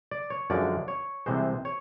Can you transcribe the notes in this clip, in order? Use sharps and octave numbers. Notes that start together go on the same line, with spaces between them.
D5
C#5
F#2 D3 F3 G#3 D5
C#5
C2 C3 E3 G#3 C5
C#5